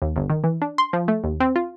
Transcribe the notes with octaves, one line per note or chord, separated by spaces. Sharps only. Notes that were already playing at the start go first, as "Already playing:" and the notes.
D#2
G1
D#3
E3
D4
C6
F3
A3
D#2
C4
F4